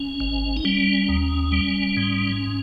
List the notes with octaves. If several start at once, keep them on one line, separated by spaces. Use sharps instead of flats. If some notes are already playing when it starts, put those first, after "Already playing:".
Already playing: C#4
G#1
D#4
G3 C#4
D#2
G3
G#2